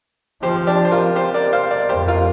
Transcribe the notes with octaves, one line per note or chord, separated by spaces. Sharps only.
F3 G4 C5
D4 G4
C5
F4 A#4
G4 C5
A#4 D5
C5 F5
A#4 D5
F2 G4 C5
F4 A#4